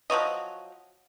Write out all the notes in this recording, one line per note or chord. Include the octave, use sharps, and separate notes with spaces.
F3 F#3 C#5 D#5